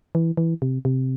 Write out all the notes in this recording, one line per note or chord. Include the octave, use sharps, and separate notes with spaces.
E3
E3
C3
C3